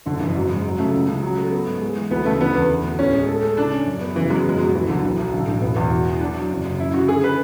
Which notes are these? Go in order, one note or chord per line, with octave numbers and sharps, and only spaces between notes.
F#1 D3
F#1 E3
G#2 F#3
G#2 G#3
F#3
C#3 A3
C#2
C#3
F#3
A3
B3
G#2
G#3
E3
D2 B3
C#3 A3
D3 B3
E2
B3
D2
A2 C#4
G#3
A4
A3
C#3 D4
C#4
F#2
B3
C#3 E3
F#3 G#3
F#1 G#3
B2 F#3
D2 E3
D3 F#3
B1 E3
B1
A1 D3
A1
E1 B3
E2
F#4
E3
F#3 D4
F#3
F#1
C#3
F#2 E4
C#3 F#4
D3 G#4
B4